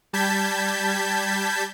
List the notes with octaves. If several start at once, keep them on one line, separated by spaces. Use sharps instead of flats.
G3 A5 G6 G#6 B6